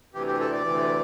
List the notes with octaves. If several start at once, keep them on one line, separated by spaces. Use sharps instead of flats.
D2 C3 E3 G4
G4
A4
D5
D2 C3 E3